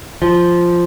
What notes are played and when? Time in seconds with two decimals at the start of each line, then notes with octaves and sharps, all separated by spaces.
0.22 F3